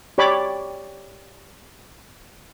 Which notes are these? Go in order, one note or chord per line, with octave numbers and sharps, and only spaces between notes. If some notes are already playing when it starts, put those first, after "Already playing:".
G4 C#5 D5 B5 D6